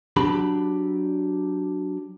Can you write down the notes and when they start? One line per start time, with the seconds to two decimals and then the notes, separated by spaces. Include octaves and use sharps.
0.17 F#3 D4 G4 B5